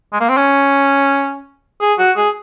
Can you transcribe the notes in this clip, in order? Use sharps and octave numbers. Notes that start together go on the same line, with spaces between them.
G#3
A#3
C4
C#4
G#4
F#4
G#4